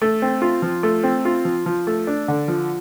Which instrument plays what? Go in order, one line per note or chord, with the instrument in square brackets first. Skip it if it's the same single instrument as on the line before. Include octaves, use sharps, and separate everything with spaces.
[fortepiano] A3
C4
F4
F3
A3
C4
F4
F3
F3
A3
D4
D3
F3